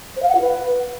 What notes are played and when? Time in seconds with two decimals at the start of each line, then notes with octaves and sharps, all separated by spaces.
0.16 C5
0.22 F5
0.29 F#5
0.35 F4
0.41 B4